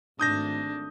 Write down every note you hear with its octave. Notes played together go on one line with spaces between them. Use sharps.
G#1 A3 D4 D#6 G6 A#6